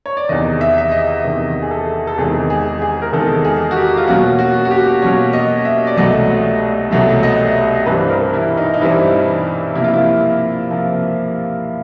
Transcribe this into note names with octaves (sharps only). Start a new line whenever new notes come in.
C#5
D5
E2 C3 D#3 D#5
E5
E5
D#5
E2 C3 D#3
G#4
A4
A4
E2 C3 D#3 G#3 G#4
G#4
G#4
A#4
E2 C3 D#3 G#3 A4
G#4
F#4
G4
F4
B2 F#3 A#3 C#4 F#4
F#4
F#4
G4
B2 F#3 A#3 C#4 C#5
D#5
E5
D5
C2 B2 F#3 A3 D#5
C2 B2 F#3 A3 E5
D#5
G2 E3 G3 C4 B4
A#4
E4
D#4
D#4
G2 E3 G3 C4 E4
C3 F3 A#3 E4
F4
E4
C3 F3 A#3